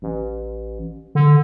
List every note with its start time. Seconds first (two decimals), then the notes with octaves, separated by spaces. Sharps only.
0.02 A1
1.15 D3